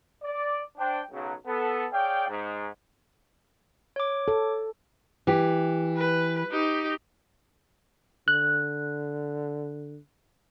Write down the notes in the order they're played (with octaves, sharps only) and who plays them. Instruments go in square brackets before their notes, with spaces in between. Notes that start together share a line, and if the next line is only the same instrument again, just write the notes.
[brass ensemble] D5
D4 C5 G5
B1 C#3 F#3
B3 A4
G#4 C#5 D5 F5 G5
G#2
[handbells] C#5 D6
[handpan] A4
[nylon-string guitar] E3 G4
[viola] B4
D#4 G4
[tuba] D3 [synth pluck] F#6